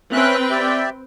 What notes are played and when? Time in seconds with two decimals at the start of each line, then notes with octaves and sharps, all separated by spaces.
0.12 C4 C#4 B4 E5 G5 F#6
0.51 G4 D5 E5